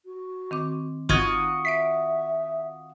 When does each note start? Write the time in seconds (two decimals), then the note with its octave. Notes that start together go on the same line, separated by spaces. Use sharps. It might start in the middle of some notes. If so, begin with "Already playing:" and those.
0.05 F#4
0.51 D#3 C4 D6
1.09 G#1 D#4 F4 F#4 D#5 G#6
1.65 E5 B6 C7 D7